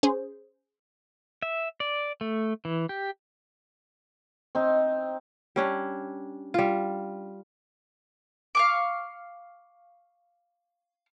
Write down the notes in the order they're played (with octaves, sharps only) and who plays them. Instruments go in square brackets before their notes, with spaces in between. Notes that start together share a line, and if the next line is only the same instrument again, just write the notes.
[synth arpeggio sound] C#4 G#4 C5
[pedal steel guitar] E5
D5
A3
E3
G4
[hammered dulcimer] C4 D#4
[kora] G3 C#4 D4
G3 F4
[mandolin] F5 C#6 D6